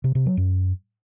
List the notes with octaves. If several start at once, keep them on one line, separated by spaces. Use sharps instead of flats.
C3
C3
F#3
F#2